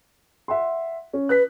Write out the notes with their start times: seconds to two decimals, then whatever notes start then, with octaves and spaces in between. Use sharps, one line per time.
0.48 E5 F#5 C6
1.13 C#4
1.29 B4 F#6 B6